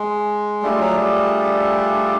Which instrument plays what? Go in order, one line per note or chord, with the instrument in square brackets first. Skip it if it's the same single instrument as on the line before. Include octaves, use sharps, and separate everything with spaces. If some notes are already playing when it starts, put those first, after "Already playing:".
Already playing: [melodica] G#3
[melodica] G3 [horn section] A3 D4 F4 G#4
[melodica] F#3
G3